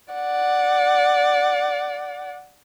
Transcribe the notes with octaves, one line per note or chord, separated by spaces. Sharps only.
D5 F#5